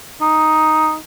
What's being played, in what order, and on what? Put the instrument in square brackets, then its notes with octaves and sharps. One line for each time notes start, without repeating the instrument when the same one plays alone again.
[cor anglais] D#4